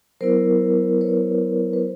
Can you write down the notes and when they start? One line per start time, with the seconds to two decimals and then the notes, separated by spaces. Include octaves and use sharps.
0.21 F#3 B3 E4 A#4 C5
1.01 B4 C#5
1.73 B4